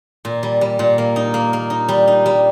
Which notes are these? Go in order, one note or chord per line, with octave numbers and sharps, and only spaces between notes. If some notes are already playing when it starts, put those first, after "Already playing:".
A#2
G3
G3
A#2
A#3
D#4
A#3
A#3
D#4
G3
D#4
G3